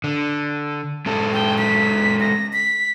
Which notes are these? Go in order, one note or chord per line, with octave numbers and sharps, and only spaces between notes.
D3
G#3 C#4 A4
G5
B6
A#6
B6